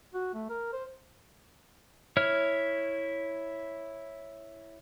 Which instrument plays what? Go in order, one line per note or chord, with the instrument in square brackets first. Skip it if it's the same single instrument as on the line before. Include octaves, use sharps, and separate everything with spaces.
[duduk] F#4
A3
A#4
C5
[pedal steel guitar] E4 C#5 F6